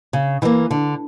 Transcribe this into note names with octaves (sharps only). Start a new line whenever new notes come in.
C#3
E3 G3 A#3
D3